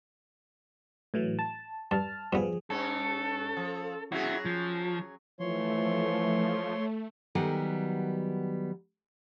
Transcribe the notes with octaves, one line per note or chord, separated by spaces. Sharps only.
A2 E3 F#3
A5
G2 A5 F6
G2 F3 B3 G#4
G2 C#4 A4
F3
F#3 C#4 E4 F#4 G#4
F3
E3 F3 A3 C#5 C6
D#3 F#3 G3 B3 F#5 G#5